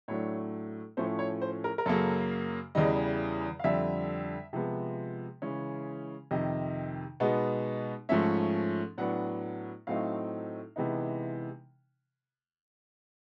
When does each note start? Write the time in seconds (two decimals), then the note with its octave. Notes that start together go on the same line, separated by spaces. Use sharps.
0.08 A2 F#3 A3 D4 C#5
0.97 A2 F3 A3 C#4 C5
1.19 C#5
1.42 C5
1.64 A#4
1.78 A#4
1.86 F#2 C#3 F#3 A#3 A4
2.75 E2 C#3 E3 G3 D#5
3.59 F5
3.64 F2 D3 G3 E5
4.53 C3 F3 G#3 B3
5.42 C#3 E3 G#3 C#4
6.31 F2 C3 D#3 D#5
7.20 B2 G#3 B3 D#4
8.09 G#2 F3 A3 C#4 E5
8.98 A2 F#3 B3 D4 F#5
9.87 A2 F#3 A3 C4 D#4 F5
10.76 C3 E3 G#3 B3 D#4